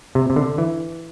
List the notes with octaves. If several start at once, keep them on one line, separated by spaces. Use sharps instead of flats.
C3
C3
D3
E3